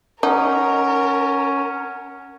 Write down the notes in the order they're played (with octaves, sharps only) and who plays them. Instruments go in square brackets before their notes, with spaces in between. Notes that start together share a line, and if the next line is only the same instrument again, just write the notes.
[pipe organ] C#4 [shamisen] D#4 [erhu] A#4 [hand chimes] F#5